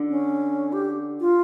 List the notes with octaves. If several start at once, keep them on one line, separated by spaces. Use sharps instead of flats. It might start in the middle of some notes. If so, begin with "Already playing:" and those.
Already playing: D3
C#4
G4
F4